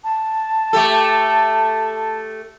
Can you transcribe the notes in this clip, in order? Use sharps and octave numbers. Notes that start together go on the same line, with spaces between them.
A5
A3 G4 A4